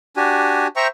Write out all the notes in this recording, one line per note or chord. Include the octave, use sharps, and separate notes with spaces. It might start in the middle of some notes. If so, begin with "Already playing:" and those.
D4 F#4 G4 G#5
C5 E5 G5 A#5 C#6